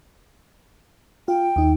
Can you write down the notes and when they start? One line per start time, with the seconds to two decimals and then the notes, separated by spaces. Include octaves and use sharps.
1.28 F4 G5
1.56 D#2 D#4